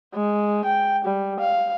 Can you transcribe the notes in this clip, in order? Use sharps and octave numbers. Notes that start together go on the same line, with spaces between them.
G#3
G5
G3
F5